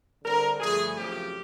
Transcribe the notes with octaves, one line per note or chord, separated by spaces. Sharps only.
D3 G3 C4 A#4
G2 D3 F3 A3 G#4
F#2 C#3 F3 A3 C4 G4